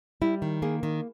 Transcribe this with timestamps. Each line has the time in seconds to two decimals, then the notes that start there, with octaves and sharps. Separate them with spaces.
0.22 G3 E4
0.42 D#3
0.62 A#3 G#4
0.83 D#3